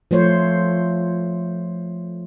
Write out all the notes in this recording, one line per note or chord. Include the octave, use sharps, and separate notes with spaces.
F3 A3 C5 C#5